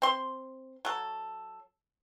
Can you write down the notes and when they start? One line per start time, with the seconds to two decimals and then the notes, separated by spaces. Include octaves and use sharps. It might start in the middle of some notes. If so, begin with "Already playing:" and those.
0.02 C4 C6
0.85 F#3 A4